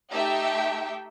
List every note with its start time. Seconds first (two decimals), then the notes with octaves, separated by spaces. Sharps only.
0.12 A3 D#4 G4 E5 G5